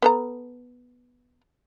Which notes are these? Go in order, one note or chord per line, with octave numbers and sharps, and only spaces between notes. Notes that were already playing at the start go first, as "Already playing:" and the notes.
B3 A4 A#5